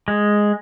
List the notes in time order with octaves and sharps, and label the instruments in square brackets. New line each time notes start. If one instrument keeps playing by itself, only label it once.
[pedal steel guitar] G#3